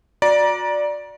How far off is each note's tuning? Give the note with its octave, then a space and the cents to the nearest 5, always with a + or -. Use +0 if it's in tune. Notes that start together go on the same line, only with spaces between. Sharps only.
F#4 -35 D5 +0 A#5 +30